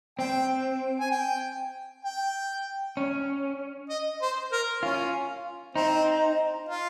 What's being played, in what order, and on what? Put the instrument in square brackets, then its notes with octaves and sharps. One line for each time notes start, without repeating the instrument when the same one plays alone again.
[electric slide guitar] C4 [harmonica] G5
[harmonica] G#5
G5
G5
[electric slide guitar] C#4
[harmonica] D#5
C5
A#4
[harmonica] C#4 [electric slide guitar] F4
[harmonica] C4 [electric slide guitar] D#4
[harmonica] F4